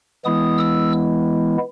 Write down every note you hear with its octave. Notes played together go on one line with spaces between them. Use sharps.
E3 G#3 B3 E4 D#6
E6